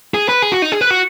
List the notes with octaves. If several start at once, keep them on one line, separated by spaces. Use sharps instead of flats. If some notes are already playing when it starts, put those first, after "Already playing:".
G#4
B4
G#4
F#4
D#4
G#4
B4
F#4